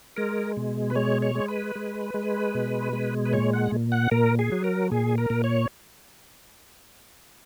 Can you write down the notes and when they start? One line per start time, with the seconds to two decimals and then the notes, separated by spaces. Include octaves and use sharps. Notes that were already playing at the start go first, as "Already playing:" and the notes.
0.16 G#3 A#4
0.57 B2
0.90 B4
0.95 G#3 C#5
1.22 C#5
1.35 G#3
1.48 B4
1.76 G#3
2.14 G#3
2.55 B2
2.93 G#3
3.25 B4
3.33 A#2 C#5
3.53 F#5
3.72 A#2
3.92 F#5
4.11 A#2 A#4
4.39 G#4
4.52 F#3
4.64 A#4
4.91 A#2 G#4
5.18 A#4
5.30 A#2
5.44 C#5